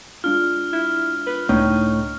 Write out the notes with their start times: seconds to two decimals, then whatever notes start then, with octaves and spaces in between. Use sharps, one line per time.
0.24 G#3 D4 F4 F6
0.73 E4
1.27 B4
1.49 C#2 A2 D4 D#4